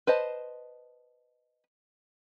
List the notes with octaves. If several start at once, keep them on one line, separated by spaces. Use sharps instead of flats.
B4 C5 D#5 A5